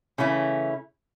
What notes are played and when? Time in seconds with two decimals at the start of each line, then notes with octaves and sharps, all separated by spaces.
0.18 C#3 E3 A3 C#4 E4